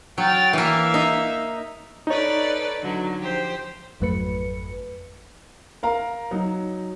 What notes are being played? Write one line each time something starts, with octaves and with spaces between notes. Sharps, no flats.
F#3 G5 F6 A6
E3 A#3 E5 F5
D#4
D#4 A4 B4 C#5 D5
D3 F#3
F3 G4 C5
G#1 F2 F#3 A3 B4 C#7
A#4 F5 A#5
F#3 D#4